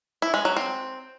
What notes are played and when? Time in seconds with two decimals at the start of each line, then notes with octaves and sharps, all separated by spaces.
0.22 E4
0.34 G#3
0.45 F#3
0.56 C4